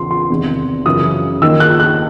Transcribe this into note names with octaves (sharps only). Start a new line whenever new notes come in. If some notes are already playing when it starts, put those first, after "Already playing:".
Already playing: E2 C#3 E3 C6
C6
E2 C3 D#3
F#2 C#3 E3 D#6
D#2 D#3 E6
F#6
F#6